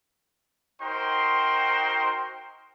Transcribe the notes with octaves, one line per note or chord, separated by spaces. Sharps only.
D#4 F#4 A#4 C5 G5 C6